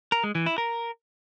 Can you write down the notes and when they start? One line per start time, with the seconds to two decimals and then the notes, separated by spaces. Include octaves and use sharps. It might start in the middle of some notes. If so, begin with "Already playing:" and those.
0.12 A#4
0.24 G#3
0.35 E3
0.46 E4
0.58 A#4